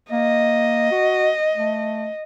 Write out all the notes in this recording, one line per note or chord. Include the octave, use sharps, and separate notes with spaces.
A#3 D#5
F#4
A3